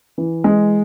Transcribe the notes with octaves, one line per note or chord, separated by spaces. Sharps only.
E3
G#3